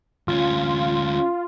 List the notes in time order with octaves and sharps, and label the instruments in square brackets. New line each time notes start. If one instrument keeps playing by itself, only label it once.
[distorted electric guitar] D2 C#4 [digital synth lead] F4